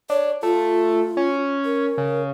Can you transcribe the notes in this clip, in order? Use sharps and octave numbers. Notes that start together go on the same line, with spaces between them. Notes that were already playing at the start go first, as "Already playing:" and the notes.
D4 C#5
A3 F4
C#4
A#4
C#3